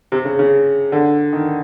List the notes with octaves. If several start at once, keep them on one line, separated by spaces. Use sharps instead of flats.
C3
C#3
C#3
D3
D#3